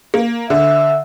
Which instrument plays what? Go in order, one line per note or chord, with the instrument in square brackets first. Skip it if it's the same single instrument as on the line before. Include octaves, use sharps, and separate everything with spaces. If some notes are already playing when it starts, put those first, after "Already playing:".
[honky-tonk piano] A#3
[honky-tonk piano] D3 [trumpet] E5